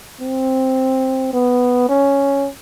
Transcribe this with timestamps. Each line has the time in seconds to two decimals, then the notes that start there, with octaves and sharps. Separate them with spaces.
0.21 C4
1.33 B3
1.89 C#4